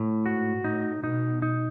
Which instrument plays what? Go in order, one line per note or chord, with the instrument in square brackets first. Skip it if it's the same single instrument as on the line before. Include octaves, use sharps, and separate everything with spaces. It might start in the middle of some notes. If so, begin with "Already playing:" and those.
Already playing: [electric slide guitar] A2
[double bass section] G#2 [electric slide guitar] F#4
[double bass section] A2 [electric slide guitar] D#4
[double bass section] B2 [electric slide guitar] D#4
[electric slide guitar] D#4